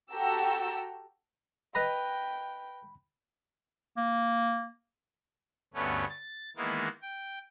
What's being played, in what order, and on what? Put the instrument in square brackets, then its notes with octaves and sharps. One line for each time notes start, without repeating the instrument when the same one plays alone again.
[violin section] F#4 G4 A4 G5 A#5 E6
[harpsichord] B4 D#5 A#5 [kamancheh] G5 [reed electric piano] B5
[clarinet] A#3
[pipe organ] D2 G2 A3 B3 C#4
A6
D#3 E3 G#3 A#3 B3 E4
G5